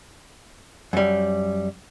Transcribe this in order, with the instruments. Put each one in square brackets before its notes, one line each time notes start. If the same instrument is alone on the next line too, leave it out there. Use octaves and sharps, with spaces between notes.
[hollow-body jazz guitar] F#2 G3